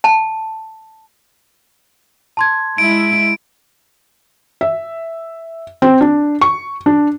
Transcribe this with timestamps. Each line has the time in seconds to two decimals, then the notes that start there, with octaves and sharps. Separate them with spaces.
0.04 A5
2.37 A5 C6 G#6
2.78 G#3 E4 D7
4.61 E5
5.82 C4
6.01 D4
6.41 C#6
6.86 D4